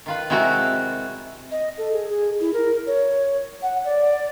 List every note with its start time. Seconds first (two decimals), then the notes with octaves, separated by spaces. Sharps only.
0.06 D#3 F4 B4
0.30 C3 G#3 E4 F#4 A#4 A5
1.51 D#5
1.78 A4
1.93 G#4
2.09 G#4
2.40 E4
2.53 A#4
2.87 C#5
3.62 F#5
3.85 D5